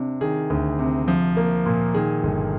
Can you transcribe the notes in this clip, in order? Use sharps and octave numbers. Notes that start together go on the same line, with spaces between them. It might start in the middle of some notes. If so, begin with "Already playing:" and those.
Already playing: C3 D4
D#3 G#4
D2
C3
F3
A#3
A#2
D#3 G#4
G1